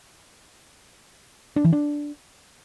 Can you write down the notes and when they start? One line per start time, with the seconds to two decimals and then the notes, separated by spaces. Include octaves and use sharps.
1.56 D4
1.64 E3
1.73 D4